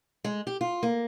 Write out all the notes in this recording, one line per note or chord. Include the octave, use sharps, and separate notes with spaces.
G#3
G4
F4
A#3